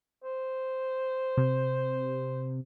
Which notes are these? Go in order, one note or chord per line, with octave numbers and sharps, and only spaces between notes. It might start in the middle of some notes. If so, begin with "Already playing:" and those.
C5
C3